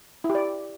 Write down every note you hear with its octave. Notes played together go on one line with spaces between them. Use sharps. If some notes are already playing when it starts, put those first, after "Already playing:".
E4
G4
D5